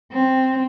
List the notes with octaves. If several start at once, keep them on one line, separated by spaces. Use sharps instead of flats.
C4